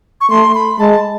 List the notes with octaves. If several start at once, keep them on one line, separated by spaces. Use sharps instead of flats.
C#6
A3 C6
B5
G#3 A5